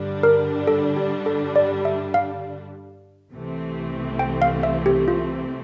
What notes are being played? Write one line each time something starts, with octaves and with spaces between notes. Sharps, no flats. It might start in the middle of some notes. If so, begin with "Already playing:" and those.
Already playing: G2 D3 G3 D4
A#4
A4
G4
A4
D5
E5
F5
C2 C3 E3 A3 C4
G5
F5
E5
G4
F4